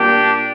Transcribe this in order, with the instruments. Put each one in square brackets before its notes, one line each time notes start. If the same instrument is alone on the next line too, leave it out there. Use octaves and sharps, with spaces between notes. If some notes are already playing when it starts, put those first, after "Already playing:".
Already playing: [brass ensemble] A#2 G3 A#3 D4 G4